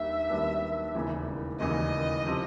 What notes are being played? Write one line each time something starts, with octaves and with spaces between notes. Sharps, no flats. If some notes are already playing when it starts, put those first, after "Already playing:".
Already playing: D#2 D#3 G3 B3 D4 E5
D#2 D#3 G3 B3 D4
E1 D#2 C#3 E3
E1 D#2 C#3 E3 D#5
C3 F3